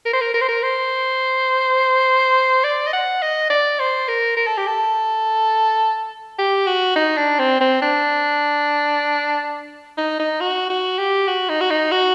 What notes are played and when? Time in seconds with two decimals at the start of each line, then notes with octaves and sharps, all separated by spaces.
0.06 A#4
0.13 C5
0.21 A#4
0.34 A#4
0.42 C5
0.49 A#4
0.63 C5
2.64 D5
2.87 D#5
2.93 F#5
3.22 D#5
3.50 D5
3.79 C5
4.08 A#4
4.37 A#4
4.47 A4
4.58 G4
4.67 A4
6.39 G4
6.67 F#4
6.96 D#4
7.17 D4
7.39 C4
7.61 C4
7.82 D4
9.98 D#4
10.19 D#4
10.41 F#4
10.70 F#4
10.99 G4
11.28 F#4
11.49 D#4
11.61 F#4
11.70 D#4
11.92 F#4